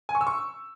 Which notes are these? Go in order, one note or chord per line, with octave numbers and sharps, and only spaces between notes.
G#5
C#6
E6
C#6